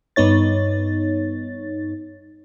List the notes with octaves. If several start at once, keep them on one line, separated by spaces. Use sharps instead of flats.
G2 B3 D#4 C#5 A6